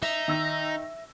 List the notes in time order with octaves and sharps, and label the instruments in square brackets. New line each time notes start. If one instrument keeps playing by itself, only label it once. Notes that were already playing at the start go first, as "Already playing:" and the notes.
[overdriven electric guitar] D#4 [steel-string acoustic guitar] E5
[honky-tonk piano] D#3 E6 A#6